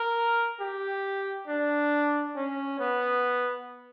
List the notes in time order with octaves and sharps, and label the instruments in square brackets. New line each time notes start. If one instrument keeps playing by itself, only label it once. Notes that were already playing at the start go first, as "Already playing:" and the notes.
Already playing: [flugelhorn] A#4
G4
D4
C#4
B3